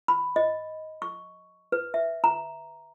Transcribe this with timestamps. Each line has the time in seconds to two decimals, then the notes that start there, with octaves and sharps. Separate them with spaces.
0.08 B5
0.36 D#5
1.02 C#6
1.72 B4
1.94 E5
2.24 A#5